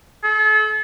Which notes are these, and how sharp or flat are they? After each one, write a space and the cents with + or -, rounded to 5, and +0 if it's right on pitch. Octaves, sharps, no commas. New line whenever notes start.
A4 -40